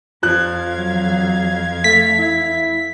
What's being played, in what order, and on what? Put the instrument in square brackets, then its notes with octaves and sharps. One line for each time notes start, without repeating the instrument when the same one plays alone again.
[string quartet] F2 F5 G#6 [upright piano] F3 F#6
[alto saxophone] F#3
[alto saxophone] A3 [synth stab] B6
[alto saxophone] E4